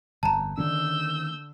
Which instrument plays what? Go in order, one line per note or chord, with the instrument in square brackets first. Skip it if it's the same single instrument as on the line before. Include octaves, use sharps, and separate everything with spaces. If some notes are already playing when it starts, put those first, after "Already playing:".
[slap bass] G1 F2 [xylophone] A5 A#5
[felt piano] D3 [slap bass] D#3 A#3 C#4 [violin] E6 G6